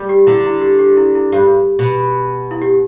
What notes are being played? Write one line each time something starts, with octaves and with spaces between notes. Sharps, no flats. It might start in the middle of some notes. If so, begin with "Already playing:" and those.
Already playing: G3
G4
D3 E4
E4
G4
G4
E4
E4
G2 G4
B2
E4
G4